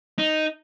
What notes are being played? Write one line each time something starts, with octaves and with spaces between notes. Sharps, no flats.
D#4